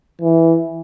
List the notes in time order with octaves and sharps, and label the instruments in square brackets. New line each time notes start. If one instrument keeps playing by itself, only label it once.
[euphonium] E3